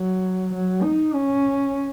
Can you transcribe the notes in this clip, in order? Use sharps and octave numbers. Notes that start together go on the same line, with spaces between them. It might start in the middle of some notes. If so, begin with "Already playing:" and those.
Already playing: F#3
F#3
D#4
C#4